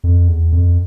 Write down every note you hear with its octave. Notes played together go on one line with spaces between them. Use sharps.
F2
E2
F2